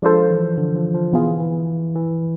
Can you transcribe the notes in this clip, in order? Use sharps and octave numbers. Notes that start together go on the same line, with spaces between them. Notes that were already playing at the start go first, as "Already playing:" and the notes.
F3 G#3 D4 F4 A4 C5
E3
D3
F3
F3
B2 E3 B3 F4 G#4
E3
E3